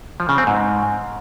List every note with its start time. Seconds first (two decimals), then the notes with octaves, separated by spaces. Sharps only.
0.20 F3
0.29 C#3
0.38 C4
0.47 G#2